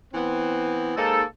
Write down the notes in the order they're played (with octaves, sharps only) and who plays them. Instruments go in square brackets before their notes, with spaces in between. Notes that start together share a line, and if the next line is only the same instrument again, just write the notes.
[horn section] E3 B3 C4
[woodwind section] G#3 D#4 A4 [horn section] A#3 C5